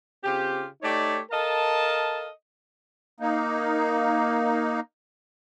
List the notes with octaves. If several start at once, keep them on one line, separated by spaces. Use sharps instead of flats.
C#3 C4 F4 G4
A3 D#4 G4 C#5 D5
A4 A#4 D#5 F5 A5
A#3 D#4